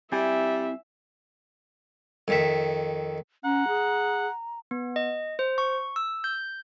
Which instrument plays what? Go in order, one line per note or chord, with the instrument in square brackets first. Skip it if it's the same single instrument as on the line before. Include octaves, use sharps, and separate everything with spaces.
[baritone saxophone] G3 [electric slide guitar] C4 E4 G#5 [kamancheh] E5
[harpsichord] F2 D#3 E5
[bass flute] C#4 [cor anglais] F#5 [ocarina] A#5
[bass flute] G#4
[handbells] B3
D#5
C5
C#6
E6
G6